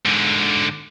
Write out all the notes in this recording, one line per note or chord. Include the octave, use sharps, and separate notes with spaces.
G#2 D3